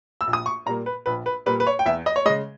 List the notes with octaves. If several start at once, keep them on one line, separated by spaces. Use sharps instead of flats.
E6
A#1
D#6
C#6
A#2 G3 A#3 A#5
B4
A#1 B4
B4
A#2 G3 A#3 B4
B4
C#5
G5
E2 E5
D#5
C#5
C#3 G#3 D#5